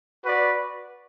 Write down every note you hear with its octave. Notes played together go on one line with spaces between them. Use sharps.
F#4 B4 D5